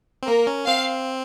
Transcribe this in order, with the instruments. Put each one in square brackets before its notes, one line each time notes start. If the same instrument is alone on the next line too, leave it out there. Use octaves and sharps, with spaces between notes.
[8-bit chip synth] C4
[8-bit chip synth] A#3 [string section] A#4
[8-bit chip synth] C#4
[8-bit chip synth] C4 [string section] F5